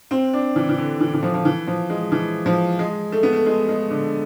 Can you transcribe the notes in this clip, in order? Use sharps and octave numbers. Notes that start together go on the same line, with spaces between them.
C4
D4
E3
E3
D3
E3
E3
F3
F3
E3
F3
G#3
E3
F3
G#3
A3
B3
A3
G#3
G#3
D3